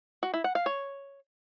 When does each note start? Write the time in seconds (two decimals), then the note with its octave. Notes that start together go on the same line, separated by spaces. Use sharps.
0.23 F#4
0.34 E4
0.44 F#5
0.55 F5
0.66 C#5